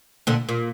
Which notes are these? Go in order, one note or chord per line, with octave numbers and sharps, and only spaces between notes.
A#2 D3
A#2